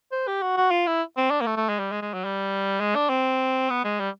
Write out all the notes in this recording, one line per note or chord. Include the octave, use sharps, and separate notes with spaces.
C5
G4
F#4
F#4
F4
E4
C4
D4
A#3
A3
A3
G#3
G3
G#3
G#3
F#3
G3
G#3
D4
C4
B3
G#3
G3